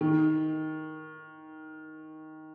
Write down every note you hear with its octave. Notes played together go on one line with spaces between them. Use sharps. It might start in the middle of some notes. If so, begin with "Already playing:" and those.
D#3